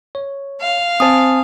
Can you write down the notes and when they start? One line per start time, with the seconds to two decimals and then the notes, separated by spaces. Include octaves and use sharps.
0.15 C#5
0.61 F5
1.00 C4 C5 G#5 A5 D#6